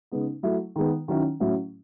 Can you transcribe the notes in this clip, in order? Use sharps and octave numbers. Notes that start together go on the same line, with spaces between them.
C#3 G#3 B3 D#4
F#3 A3 E4
D#3 G#3 B3
D#3 F#3 C#4 E4
A2 F#3 C#4 E4